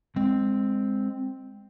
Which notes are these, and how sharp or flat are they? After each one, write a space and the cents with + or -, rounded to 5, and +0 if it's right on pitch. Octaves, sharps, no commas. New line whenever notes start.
G#3 -15 C4 +0